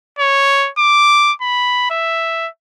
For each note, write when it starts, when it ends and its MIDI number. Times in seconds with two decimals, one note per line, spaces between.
0.19 0.69 73
0.78 1.32 86
1.41 1.89 83
1.90 2.48 76